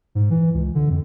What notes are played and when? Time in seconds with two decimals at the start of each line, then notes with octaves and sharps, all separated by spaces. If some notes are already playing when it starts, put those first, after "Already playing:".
0.15 G#2
0.30 E3
0.54 C#2
0.75 D3
0.89 F2